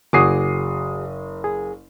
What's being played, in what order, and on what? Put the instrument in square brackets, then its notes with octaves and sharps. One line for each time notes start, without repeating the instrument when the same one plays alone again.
[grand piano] F#1 D#6 C7 [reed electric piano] F#4 G#4 D6
[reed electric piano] G#4